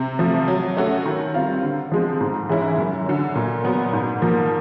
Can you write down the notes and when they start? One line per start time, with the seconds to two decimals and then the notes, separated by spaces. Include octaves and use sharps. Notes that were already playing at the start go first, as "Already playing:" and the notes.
Already playing: C3
0.19 F3 A3
0.48 F#3
0.77 A3 C#4 F#4 A4
1.05 D#3
1.34 G3 C4 F4
1.63 D3
1.92 F3 G#3 C4
2.20 G#2
2.49 E3 G#3 C#4 E4
2.78 F#2
3.06 D3 F#3
3.35 A#2
3.64 F#3 B3
3.93 G#2
4.22 F3 A#3